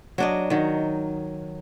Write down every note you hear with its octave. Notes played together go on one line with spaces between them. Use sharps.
F#3 D4 D#5
D#3 F#3